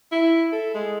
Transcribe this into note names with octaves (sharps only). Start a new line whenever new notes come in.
E4
A4
G#3